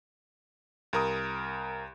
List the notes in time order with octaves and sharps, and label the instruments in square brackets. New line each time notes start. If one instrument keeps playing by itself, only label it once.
[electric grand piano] C2 A#4 D#6